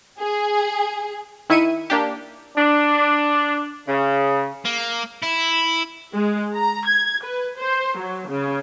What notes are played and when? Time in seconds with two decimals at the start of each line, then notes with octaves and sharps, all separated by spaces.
0.19 G#4
1.50 D#3 E4 E5 C#7 D#7
1.90 A#3 D4 G4
2.56 D4
3.88 C#3
4.65 A#3
5.23 E4
6.14 G#3
6.54 A#5
6.87 G#6
7.23 B4
7.58 C5
7.97 F#3
8.29 C#3